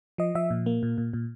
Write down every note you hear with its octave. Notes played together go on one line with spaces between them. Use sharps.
F3 D#5
F3 E5
A#2
A#3
A#2
A#2
A#2